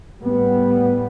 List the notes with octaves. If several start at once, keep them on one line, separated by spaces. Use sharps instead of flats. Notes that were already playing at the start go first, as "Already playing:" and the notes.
A2 G3 B3